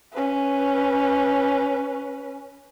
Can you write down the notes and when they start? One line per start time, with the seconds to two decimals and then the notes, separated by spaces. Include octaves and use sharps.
0.13 C#4 B4